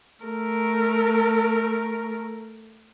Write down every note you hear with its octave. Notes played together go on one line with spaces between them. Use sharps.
A3 A#4